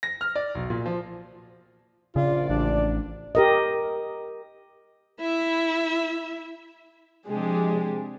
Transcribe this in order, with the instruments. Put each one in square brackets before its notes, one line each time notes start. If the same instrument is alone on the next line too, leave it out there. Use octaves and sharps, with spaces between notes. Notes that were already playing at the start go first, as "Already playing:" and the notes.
[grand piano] A#6
F6
D5
B1
A#2
F3
[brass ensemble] A#1 D5 [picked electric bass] C#3 [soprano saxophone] F4
[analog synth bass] A1 [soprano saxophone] D4
[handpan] G4 A#4 D#5
[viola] E4 E5
[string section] C3 F3 G#3 D4 G4 G#4